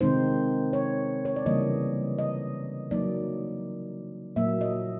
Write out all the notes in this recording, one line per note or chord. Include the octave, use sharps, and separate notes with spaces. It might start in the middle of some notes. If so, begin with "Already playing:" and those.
C3 D#3 G#3 C4 D#4 C5
C#5
C#5
D5
C#3 E3 G3 A#3 D#5
D#5
F#3 A#3 D#4 D5
A#2 F#3 A#3 E5
D#5